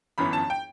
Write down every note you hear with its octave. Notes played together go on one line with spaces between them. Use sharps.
G1 F#2 E3 B3 B5
A5
G5